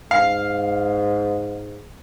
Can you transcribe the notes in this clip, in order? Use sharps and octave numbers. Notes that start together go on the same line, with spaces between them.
G#2 F5